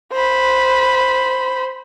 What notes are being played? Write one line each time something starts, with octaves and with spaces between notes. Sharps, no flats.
C5 B5